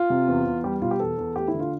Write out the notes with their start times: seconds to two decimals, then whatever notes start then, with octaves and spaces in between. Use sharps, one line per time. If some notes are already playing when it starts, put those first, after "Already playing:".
Already playing: F4
0.10 C3
0.28 E2
0.46 E2
0.64 G3 G4
0.82 B2 F4
0.91 G4
1.00 E2 A4
1.18 E2
1.36 A3 G4
1.48 E4
1.54 D3
1.60 F4